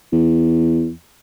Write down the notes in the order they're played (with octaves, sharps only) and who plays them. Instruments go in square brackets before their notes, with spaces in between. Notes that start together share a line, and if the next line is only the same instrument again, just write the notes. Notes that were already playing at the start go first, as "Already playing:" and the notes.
[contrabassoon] E2